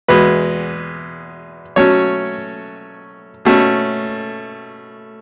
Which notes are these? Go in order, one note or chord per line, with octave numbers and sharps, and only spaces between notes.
E2 B2 G#3 B4
B2 F#3 A3 C#4 C#5
B2 A3 C#4